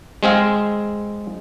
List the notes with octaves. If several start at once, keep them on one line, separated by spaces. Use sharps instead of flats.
G#3 C4 G#4 F5